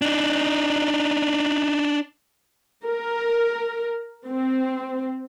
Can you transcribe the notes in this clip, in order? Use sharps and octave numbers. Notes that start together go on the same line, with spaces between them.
D4 D#4
A#4
C4